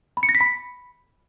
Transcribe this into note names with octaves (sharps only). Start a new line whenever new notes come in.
B5
C#7
A#6
B6
B5